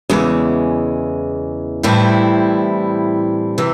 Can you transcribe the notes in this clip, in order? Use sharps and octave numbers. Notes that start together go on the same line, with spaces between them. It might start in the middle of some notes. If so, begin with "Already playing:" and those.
E2 C#3 E3 G#3
A2 E3 G3 C4 E4
C3 E3